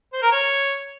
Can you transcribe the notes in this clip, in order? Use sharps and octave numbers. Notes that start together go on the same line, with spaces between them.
C5
A#4
C#5